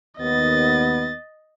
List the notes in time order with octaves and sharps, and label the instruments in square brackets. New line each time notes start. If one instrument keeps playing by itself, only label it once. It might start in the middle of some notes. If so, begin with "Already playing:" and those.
[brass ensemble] D#2 B3 [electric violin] D#5 A6